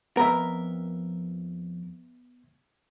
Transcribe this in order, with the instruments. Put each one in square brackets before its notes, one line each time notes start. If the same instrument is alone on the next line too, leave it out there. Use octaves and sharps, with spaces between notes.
[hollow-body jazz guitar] F2 G#2 A#4 [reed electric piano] B3 E5